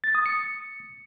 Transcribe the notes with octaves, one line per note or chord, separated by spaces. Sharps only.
A6
D#6
C#7